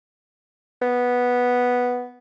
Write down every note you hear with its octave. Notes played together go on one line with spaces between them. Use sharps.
B3